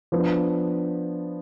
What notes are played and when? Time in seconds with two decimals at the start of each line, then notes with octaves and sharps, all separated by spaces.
0.12 F3 B3 D4